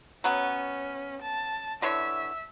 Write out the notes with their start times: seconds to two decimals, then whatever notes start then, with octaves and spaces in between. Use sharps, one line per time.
0.24 F#3 B3 C#4
1.22 A5
1.82 D3 E3 C#5 E5